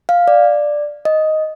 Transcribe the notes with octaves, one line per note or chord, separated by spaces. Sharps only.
F5
D5
D#5